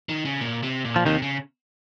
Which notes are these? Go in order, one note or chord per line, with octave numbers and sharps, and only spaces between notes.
D#3
C#3
A#2
C3
A#2
F3
D#2 C3 D#3
C#3